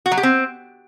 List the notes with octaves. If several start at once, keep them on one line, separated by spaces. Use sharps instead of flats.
F#4
F#3
G4
C4